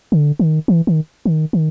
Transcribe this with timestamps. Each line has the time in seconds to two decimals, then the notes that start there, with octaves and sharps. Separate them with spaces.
0.12 D3
0.39 D#3
0.68 E3
0.87 D#3
1.25 D#3
1.53 D#3